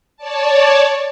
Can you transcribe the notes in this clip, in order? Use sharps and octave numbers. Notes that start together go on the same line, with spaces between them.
C#5 D5 A5